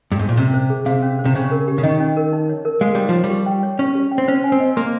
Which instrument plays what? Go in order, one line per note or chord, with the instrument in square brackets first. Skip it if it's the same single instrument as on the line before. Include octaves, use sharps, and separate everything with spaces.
[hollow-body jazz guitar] G2
G#2
A#2
[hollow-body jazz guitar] C3 [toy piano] C#4
[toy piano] C5
G#4
[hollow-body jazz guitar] C3 [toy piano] F5
[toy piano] C#4
C5
[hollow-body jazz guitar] C3
[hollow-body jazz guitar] C#3 [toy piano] C#4
[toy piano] A#4
G4
[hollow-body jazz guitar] C#3
[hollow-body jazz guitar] D#3 [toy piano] D#5
[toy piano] C#4
A#4
D#4
C#5
A#4
[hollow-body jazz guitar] G#3 [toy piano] F5
[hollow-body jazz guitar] G3 [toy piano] D#4
[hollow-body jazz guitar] F3
[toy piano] C#5
[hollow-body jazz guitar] G3
[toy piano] G4
G5
C#5
[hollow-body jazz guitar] C#4 [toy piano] C#6
[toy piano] G4
G5
[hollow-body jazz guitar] C4
[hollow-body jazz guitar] C#4 [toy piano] C5
[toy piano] G#5
[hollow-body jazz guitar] C4
[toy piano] D#5
[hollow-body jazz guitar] A#3 [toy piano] C6